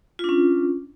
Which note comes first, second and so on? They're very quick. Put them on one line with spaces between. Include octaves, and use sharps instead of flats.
F4 D4 C#4